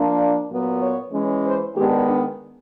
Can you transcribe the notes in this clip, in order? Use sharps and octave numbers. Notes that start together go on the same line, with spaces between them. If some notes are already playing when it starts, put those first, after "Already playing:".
Already playing: F3 A#3 D4
D5
A#2 F#3 B3
C#5
E3 G#3 C#4
C5
D#3 G#3 B3 D4 G4
D4